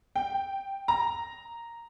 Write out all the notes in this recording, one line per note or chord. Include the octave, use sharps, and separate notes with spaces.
G5
A#5